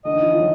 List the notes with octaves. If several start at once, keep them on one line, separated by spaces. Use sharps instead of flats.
D3 D#5
D#3
E3
F3
F#3